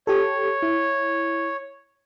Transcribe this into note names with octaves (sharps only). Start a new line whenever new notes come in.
G4 A4 C#5
E4